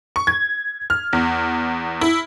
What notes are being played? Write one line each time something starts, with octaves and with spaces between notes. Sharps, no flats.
C#6
G#6
F6
E2
E4